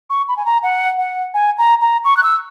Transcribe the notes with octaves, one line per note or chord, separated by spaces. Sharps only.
C#6
B5
G#5
A#5
F#5
F#5
G#5
A#5
A#5
C#6
F#6
E6